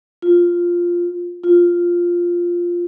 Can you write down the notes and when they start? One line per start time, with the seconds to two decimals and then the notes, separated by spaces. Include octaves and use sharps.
0.22 F4
1.44 F4